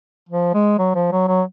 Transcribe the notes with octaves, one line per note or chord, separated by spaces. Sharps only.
F3
G#3
F#3
F3
F#3
F#3